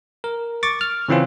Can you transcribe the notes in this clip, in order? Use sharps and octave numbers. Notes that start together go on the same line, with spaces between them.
A#4
C#6 D6 A6
F6
C#3 E3 C4 C#4 F4